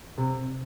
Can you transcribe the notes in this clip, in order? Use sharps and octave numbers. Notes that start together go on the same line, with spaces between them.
C3